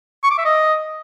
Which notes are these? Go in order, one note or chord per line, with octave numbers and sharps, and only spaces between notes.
C#6
D6
E5
D#5